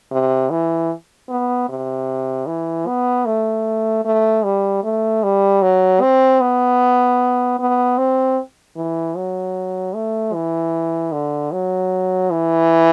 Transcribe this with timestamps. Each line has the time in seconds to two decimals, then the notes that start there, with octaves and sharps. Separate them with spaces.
0.11 C3
0.50 E3
1.29 B3
1.69 C3
2.47 E3
2.87 B3
3.26 A3
4.05 A3
4.44 G3
4.84 A3
5.23 G3
5.62 F#3
6.01 C4
6.41 B3
7.59 B3
7.98 C4
8.76 E3
9.16 F#3
9.95 A3
10.34 E3
11.12 D3
11.52 F#3
12.31 E3